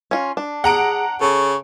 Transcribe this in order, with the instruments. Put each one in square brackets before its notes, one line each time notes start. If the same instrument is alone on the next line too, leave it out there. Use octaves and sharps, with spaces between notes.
[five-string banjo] C#4 F4
D4
[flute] G#4 [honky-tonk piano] F#5 A#5 D7
[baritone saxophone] C#3 [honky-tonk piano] A4 [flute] C#6